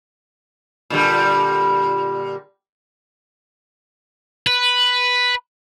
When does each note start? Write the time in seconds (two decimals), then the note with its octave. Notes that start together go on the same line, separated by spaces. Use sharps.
0.90 A#2 D3 G3
4.47 B4